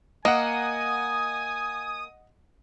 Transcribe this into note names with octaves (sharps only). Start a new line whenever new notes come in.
A#3 D#5 F#5 G#5 D#6